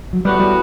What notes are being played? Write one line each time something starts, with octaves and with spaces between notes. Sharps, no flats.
F#3
A2 E3 G3 B3 F#4
G3